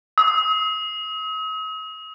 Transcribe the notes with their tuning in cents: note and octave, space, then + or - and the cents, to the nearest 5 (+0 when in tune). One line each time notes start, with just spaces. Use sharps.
D#6 +45